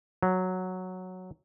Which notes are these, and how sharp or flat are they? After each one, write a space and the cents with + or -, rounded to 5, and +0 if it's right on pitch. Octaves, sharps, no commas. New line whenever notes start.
F#3 -5